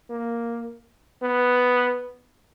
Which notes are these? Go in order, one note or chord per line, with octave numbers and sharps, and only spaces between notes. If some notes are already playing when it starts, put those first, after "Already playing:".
A#3
B3